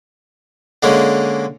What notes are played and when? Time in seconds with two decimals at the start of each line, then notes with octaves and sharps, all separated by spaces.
0.83 D3 G#3 A#3 C#4